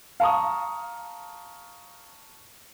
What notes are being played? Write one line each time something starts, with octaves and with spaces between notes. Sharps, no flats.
F5 A5 A#5 C#6 D#6